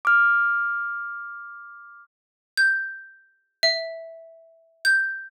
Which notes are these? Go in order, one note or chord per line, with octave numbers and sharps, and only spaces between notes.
D6 F6
G6
E5
G6